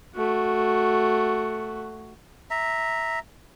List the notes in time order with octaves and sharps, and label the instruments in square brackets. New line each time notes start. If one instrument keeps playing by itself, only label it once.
[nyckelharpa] A3 F#4
[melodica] E5 A#5